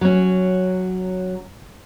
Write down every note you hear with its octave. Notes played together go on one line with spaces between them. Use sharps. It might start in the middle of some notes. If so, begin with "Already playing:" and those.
F#3 C#4